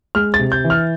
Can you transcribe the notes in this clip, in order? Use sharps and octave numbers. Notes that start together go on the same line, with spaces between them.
G#3 F6
A6
C3
G6
E3
F6